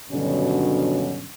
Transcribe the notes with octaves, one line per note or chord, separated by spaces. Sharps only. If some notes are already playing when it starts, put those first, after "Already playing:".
G2 B2 D3 D#3 F#3 C#4